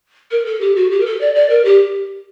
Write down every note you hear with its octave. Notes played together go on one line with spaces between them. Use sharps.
A#4
A4
G4
F#4
G4
A#4
A4
D5
D5
A#4
G4